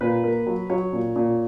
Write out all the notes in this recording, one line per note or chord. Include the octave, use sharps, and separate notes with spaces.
A#2 B4
A#3
F#3
F#3 C#5
A#2
A#2